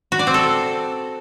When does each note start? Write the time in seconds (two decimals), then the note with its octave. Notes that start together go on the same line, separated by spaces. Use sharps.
0.12 F#4
0.19 D5
0.27 C4
0.34 A4